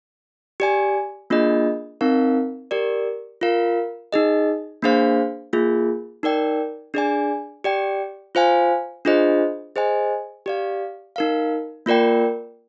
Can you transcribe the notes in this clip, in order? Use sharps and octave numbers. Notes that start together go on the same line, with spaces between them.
G4 D5 G#5
A#3 D4 F4 G#4 D#5
C4 D#4 A#4 F5
G4 A#4 D5
F4 A#4 F5
D#4 G#4 D#5
A#3 D4 G#4 C5 F5
A#3 F4 G#4
D#4 A#4 D5 G5
D4 G#4 D5 G#5
G4 D5 G5
F4 C5 F5 G#5
D4 F4 G#4 C5 D#5
G#4 C5 D#5 G#5
G4 D5 F5
D#4 A#4 F5
A#3 F4 A#4 D5 G5